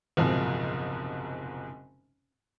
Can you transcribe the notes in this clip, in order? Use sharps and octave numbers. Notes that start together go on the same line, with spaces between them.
F#1 B1 G#2 C3 F3